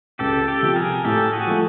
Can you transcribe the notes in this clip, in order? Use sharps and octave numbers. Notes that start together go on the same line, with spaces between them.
C#2 G4 A4
G4 A4
C3 F3
G#4 A#4
A2 G4 A4
F#4 G#4
F3 A3